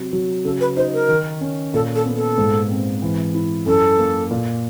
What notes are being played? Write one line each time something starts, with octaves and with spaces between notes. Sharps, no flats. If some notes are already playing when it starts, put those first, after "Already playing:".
Already playing: C3 F#3
F#3
C#3 A4
B4
D#4 C5
A#4
D#3
C#4
A#2 A4
A4
B3
A4
G#2
C4
E3
E4
F#2 A4
A#3
A#2